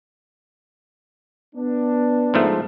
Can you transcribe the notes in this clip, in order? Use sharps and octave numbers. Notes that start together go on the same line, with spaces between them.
B3 D4
G#2 F3 A3